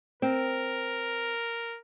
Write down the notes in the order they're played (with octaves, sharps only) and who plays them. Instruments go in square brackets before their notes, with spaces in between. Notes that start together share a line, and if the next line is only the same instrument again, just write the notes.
[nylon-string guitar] C4 [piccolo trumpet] A#4